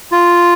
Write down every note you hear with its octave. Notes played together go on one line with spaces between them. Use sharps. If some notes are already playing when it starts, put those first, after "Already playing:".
F4